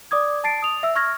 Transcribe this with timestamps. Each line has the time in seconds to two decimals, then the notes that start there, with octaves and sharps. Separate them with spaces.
0.11 D5 D6 D#6 G#6
0.44 A5 A6 C7 D7
0.62 D#6 F7
0.83 E5 E6
0.96 C#6 F6 G#6 A#6